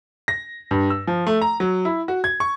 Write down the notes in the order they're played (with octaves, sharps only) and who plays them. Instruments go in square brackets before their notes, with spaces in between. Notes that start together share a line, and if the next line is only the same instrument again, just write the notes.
[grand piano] A#6
G2
E6
F3
A3
A#5
F#3
E4
F#4
G#6
C#6